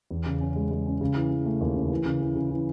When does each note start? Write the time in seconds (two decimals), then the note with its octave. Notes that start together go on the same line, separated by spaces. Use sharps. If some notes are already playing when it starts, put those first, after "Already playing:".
0.11 E2
0.26 C#3
0.41 C#4
0.56 G#3
0.71 G#3
0.86 C#4
1.01 C#3
1.16 E3
1.31 E3
1.46 A3
1.61 D#2
1.76 C#3
1.91 E3
2.06 C#3
2.21 E3
2.35 C#3
2.51 E3